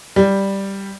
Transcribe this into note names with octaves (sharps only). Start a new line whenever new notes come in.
G3